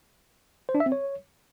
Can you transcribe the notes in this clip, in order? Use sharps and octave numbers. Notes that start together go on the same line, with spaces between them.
C5
D4
E5
C4
C#5